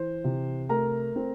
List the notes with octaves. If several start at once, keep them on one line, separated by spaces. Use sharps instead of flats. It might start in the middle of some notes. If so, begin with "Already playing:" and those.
Already playing: E3 C5
C3
A3 A#4 A#5
C4